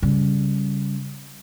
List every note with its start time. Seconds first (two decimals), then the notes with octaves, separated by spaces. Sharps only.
0.02 C#3 G3